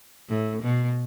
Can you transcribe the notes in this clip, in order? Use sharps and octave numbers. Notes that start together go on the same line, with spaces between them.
A2
B2